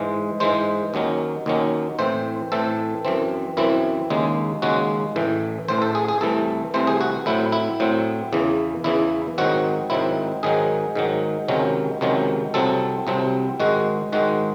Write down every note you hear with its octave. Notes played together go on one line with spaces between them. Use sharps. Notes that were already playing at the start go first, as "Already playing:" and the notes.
Already playing: G#2 E3 G#3
G#2 E3 G#3 C5
D#2 D#3 F#3 C#4
D#2 D#3 F#3 C#4
A2 E3 C4 C5
A2 E3 C4 A4
F#2 E3 C4
F#2 E3 C4 E4
D#2 C#3 G#3
D#2 C#3 G#3 F#4
A1 A2 E3
A1 A2 E3 C5
A4
G#4
G#4
C2 C3 E3 A3 A4
C2 C3 E3 A3 C5
G#4
F#4
A2 F#3 C4 E4
E4
A2 F#3 C4
E2 C#3 E3
E2 C#3 E3 E4
G#2 D#3 F#3 C4 F#4
G#2 D#3 F#3 C4 E4
G#2 D#3 F#3 G#4
G#2 D#3 F#3
C#2 C3 D#3 F#3 C#4
C#2 C3 D#3 F#3 C#4
C2 C3 F#3 C4 A4
C2 C3 F#3 C4
G#2 D#3 G#3 F#4
G#2 D#3 G#3 F#4